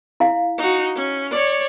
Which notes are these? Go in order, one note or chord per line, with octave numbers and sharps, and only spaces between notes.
E4 F5
D#4 F#4
C#4
C#5 D5